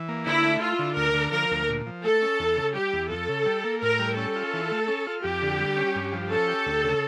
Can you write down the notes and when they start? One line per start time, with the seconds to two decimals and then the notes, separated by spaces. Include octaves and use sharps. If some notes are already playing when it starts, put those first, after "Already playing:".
Already playing: E3
0.09 A#3
0.26 D3 E4
0.43 A3
0.61 E4 F4
0.79 D3
0.97 D2 A#4
1.14 D3
1.32 F3 A#4
1.51 D2
1.69 A#2
1.86 F3
2.04 A3 A4
2.22 C#4
2.40 E2
2.57 C#3
2.74 G3 G4
2.93 E2
3.10 F2 A4
3.29 C#3
3.46 G3
3.64 A#3
3.82 A2 A#4
3.99 G3
4.17 C#4 A4
4.36 F4
4.53 E3
4.71 A3
4.88 C#4
5.07 F4
5.23 F2 G4
5.42 D3
5.59 G3
5.77 C#4
5.95 G2
6.12 F3
6.31 C#4 A4
6.48 G4
6.66 D2
6.84 C#3